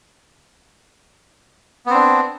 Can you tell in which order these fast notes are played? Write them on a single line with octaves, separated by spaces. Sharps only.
B3 C4 D4